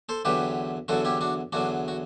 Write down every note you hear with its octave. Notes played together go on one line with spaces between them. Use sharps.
A4 C5
E2 D3 F#3 G4 B4
E2 D3 F#3 F#4 A4
E4 G4
D4 F#4
E2 D3 F#3 D4 F#4
F#4